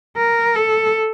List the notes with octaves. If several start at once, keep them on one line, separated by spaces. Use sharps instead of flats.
A#4
A4